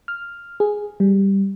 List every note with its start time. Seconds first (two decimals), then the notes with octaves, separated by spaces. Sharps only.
0.08 F6
0.60 G#4
1.00 G3